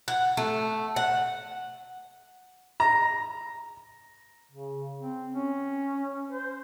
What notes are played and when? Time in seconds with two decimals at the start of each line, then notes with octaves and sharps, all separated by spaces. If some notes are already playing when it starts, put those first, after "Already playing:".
0.08 F#5
0.37 A3
0.96 F#5
2.80 A#5
4.52 C#3
5.01 C4
5.34 C#4
6.32 C5